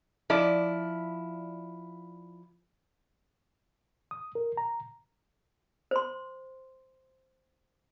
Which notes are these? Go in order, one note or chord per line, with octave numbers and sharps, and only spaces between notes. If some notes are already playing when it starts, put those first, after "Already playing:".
F3 E4 D5
D#6
A#4
A#5
C5 C6